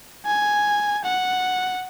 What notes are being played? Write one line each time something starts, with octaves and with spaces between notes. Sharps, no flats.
G#5
F#5